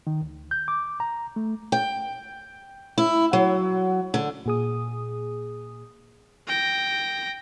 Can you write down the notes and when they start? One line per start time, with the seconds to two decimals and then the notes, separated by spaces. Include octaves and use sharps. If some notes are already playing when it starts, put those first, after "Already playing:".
0.07 D#3
0.22 D2
0.51 G6
0.68 D6
1.00 A#5
1.36 A3
1.72 G5
2.98 E4
3.33 F#3
4.14 D3
4.46 A#2 G#4 D#6
6.47 G5 A#6